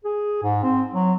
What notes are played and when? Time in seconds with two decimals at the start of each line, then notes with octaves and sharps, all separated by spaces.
0.04 G#4
0.43 G#2
0.63 C4
0.94 F#3